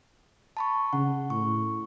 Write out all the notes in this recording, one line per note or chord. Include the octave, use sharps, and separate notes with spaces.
A5 B5 C#6
C#3 F#5
A2 C#6